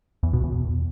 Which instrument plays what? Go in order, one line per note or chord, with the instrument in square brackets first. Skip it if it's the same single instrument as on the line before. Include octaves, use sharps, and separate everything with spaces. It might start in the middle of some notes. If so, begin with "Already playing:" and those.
[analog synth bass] E2
B2
E2